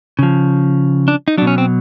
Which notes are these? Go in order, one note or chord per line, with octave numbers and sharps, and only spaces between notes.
C#3 F3
D4
D#4
B2 F#3 D4
C#4
C4